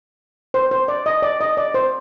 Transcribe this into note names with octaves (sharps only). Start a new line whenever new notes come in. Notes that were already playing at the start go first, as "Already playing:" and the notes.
C5
C5
D5
D#5
D5
D#5
D5
C5